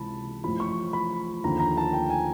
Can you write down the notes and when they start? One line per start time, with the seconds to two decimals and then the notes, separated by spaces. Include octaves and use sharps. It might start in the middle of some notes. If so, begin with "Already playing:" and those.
Already playing: C#2 C3 E3 A5 B5
0.44 A1 A2 F3 B5
0.60 C#6
0.93 B5
1.44 D#2 D3 F3 A#5
1.60 A#5
1.77 A5
1.93 G5
2.10 G#5